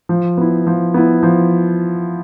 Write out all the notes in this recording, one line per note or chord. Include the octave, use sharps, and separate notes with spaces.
F3
B3 E4
F3
B3 E4
F3